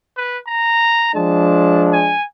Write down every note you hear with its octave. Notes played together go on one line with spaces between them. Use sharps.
B4
A#5
F3 G#3 D4 A5
G#5